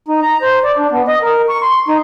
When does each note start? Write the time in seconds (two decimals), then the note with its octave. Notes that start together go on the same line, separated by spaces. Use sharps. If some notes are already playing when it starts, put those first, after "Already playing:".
0.08 D#4
0.22 A#5
0.42 C5
0.64 D5
0.77 D4
0.92 B3
1.08 D#5
1.22 A#4
1.49 C#6
1.62 C6
1.88 D#4